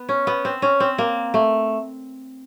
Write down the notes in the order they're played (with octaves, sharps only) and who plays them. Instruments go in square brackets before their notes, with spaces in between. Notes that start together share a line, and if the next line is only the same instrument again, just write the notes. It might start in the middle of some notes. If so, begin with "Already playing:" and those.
Already playing: [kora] B3
C#4
B3
C4
C#4
C4
A#3
A3